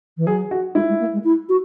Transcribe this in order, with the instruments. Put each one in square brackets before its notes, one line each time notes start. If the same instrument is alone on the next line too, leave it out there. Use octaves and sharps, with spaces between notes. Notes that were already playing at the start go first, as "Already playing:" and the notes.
[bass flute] E3
[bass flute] F#3 [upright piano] G#4
[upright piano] F#4
[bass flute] G#3 [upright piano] E4
[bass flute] G#3
A#3
G#3
E4
F#4